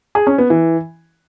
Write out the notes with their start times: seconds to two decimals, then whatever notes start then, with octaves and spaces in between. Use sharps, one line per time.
0.15 G#4
0.27 C#4
0.38 B3
0.50 E3